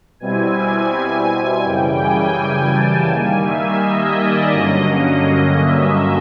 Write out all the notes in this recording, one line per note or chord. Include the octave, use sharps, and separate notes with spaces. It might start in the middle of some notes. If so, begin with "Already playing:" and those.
B2 G3 C4 E4 G#5
G#5
G#5
F#2 C#3 E3 G3 G5
G#5
A5
D#3 G3 A#3 G#5
E5
D#5
D5
G2 D3 F#3 A#3 C#4 D#5
D#5
E5